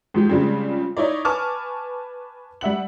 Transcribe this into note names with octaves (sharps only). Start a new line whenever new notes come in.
G#2 F3 G4
C#3 F3 G3 G#3 C4
D#4 E4 C#5 D5
B4 G#5 A5 C#6 D6 F6
G3 E5 F#5 F#7